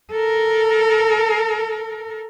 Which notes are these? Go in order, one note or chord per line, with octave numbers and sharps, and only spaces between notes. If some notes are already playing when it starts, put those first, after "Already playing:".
A4 A#4